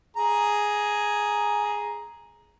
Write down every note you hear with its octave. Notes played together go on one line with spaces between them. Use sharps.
G#4 A#5